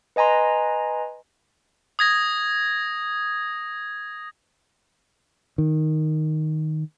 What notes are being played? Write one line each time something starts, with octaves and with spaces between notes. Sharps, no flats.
B4 D#5 G#5 A#5 C6
D#6 G#6 A#6
D#3